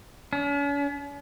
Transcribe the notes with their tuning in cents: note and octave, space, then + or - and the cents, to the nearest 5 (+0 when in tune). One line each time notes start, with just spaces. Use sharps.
C#4 +45